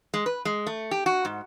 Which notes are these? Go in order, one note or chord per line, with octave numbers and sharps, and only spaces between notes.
G#3
B4
G#3
A3
G4
F#4
G#2